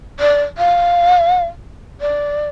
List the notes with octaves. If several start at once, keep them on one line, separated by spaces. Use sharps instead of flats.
D5
F5
D5